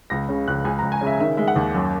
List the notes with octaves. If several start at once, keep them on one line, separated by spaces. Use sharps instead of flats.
C#2 A#6
C#3
C#2 F#6
C#2 G#5
A#5
C#2
G#5
C#3
E5
D#3 E5
G#3 E5
F#5
D#2
F#2